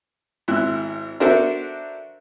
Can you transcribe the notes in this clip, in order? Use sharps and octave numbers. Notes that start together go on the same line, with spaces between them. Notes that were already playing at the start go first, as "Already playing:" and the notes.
G#1 E4 F#6
D4 F#4 A4 A#4 C5 E5